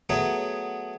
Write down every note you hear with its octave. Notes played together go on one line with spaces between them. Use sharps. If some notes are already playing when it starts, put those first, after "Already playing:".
F#3 A3 B3 G#4